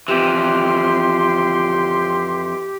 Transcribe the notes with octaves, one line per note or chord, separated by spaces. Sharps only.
F2 E3 G4 C6